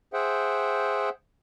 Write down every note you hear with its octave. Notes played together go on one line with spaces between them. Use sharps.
G#4 C5 E5 F#5 G5